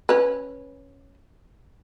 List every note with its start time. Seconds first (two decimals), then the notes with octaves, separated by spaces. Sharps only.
0.09 C#4 B4